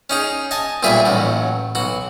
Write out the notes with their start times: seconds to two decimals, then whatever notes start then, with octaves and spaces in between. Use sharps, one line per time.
0.10 C#4 D#4 G#4
0.51 D#5 G#5 A5
0.83 B1 A#2 G3 G#4 E5 G#5
1.05 A1 D#2 F#3
1.75 B1 F#4